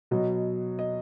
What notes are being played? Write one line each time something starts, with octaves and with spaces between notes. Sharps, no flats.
B2 F#3 D#5
D#5